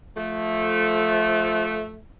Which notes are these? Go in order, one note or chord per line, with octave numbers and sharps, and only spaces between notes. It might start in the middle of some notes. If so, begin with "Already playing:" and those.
F3 A3